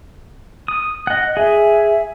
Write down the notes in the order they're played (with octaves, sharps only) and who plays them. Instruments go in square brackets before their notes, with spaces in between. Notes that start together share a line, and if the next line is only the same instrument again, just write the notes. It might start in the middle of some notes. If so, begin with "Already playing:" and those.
[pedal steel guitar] D#6
D#5 F#5
[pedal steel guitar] G#4 [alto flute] E5